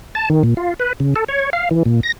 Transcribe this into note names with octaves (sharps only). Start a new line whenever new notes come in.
A5
D#3
A#2
F4
B4
C#3
A4
C#5
F5
E3
A#2
A#6